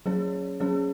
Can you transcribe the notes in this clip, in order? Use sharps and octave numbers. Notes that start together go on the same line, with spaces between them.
F#3 C#4 G#4 C#5
F#3 C#4 G#4 C#5